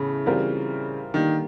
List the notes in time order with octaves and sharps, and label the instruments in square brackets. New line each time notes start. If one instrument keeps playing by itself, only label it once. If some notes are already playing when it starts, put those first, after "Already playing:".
Already playing: [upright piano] A2 E3 B3 [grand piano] C#3
[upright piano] E3 G3 C4 F4 A#4
[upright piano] D3 G3 A#3 [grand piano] D#3